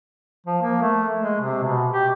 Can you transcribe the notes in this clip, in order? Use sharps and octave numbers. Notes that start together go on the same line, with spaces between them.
F3
A#3
A3
G#3
C3
B2
G4